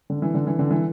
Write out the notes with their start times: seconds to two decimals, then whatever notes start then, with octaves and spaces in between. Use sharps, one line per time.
0.10 D3
0.22 E3
0.34 D3
0.47 E3
0.59 D3
0.70 E3